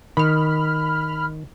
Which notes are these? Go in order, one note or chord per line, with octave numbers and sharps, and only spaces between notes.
D#3 B5 F6